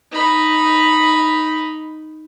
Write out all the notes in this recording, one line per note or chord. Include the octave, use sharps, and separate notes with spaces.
D#4 B5